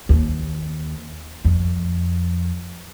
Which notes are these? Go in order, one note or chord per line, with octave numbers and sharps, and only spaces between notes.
D#2
F2